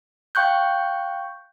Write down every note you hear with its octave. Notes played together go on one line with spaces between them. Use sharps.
F5 G5 C#6 F#6 G6